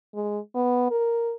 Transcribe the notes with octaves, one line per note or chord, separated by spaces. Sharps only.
G#3
B3
A#4